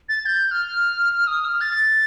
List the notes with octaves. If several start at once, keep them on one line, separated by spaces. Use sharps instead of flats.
A6
G6
F6
D#6
F6
A6